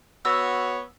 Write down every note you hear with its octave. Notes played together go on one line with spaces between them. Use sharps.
B3 F#4 C#5 E6